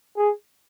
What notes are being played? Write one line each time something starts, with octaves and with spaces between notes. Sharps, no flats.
G#4